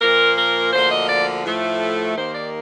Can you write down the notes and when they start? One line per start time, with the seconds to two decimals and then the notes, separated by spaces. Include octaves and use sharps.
0.01 A#2 F3 A#3 A#4
0.36 A#4
0.73 D2 D3 F3 A#3 C5
0.90 D#5
1.09 D5
1.45 A2 F3 A3
2.16 D#2 D#3 A#3 C5
2.34 D5